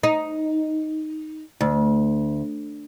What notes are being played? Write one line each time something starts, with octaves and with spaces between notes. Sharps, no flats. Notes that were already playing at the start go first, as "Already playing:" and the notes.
D#4
D2